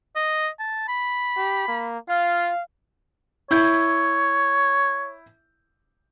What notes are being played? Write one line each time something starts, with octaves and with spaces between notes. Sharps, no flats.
D#5
A5
B5
G4
A#3
F4 F5
E4 C#5 G6